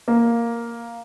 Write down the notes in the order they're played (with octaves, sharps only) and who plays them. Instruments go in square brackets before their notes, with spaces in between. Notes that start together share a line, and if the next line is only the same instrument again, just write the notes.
[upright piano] A#3